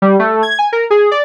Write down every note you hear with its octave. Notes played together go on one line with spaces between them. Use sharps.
G3
A3
G#6
G#5
A#4
G#4
D5